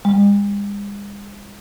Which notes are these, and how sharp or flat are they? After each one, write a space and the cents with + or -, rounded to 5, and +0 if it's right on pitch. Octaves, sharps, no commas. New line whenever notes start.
G#3 -45